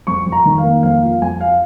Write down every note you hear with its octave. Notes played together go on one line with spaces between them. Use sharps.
F2 C#6
F2
A#5
D#3
F5
A#3
F2 F5
F3 F5
F2 G#5
F5